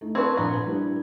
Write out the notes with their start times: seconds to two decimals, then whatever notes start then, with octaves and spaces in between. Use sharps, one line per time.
0.01 A3 D#4
0.15 C4 B4 A5 C#6 G#6
0.37 A#1 F3 B3 A#5
0.54 B4
0.65 G3 D4 E4